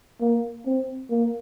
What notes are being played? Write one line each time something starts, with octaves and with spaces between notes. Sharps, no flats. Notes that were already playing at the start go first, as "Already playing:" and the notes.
A#3
C4
A#3